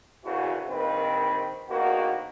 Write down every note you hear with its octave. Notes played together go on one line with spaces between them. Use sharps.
A#1 E2 C#3 E3 F#4
A#1 A#2 D#3 C4 D#4 B4
A#1 D#3 A#3 B3 F#4